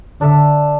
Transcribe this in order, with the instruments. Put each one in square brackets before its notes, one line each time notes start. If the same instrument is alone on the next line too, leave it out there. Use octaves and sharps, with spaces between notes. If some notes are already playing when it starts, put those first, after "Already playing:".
[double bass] D3 [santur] D4 A4 E5